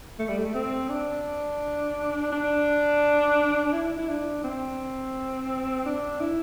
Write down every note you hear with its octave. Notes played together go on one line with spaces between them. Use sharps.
A3
G3
A3
C4
D4
D4
E4
E4
D4
C4
D4
E4